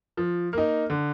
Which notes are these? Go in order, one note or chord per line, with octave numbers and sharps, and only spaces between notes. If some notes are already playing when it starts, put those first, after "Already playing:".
F3
A#3 D#4
D3